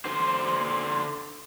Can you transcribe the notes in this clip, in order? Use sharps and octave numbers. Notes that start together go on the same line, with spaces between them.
D3 C5